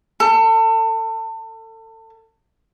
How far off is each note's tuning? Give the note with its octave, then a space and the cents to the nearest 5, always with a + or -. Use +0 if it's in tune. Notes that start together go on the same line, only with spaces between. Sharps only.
A4 +30